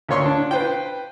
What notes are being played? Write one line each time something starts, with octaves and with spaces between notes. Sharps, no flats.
D2 A#3 C#5 C6 C#6
D4
B4 C5 G5